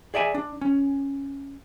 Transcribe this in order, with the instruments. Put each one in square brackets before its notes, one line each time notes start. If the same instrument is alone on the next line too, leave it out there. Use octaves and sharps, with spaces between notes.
[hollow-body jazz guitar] G#4 D5 E5 G5 G#5
D4
C#4